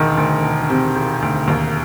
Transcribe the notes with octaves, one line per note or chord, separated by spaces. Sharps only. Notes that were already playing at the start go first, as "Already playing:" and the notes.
Already playing: E1 D2 D#3
D2
E1
C3
E1
D2
D#2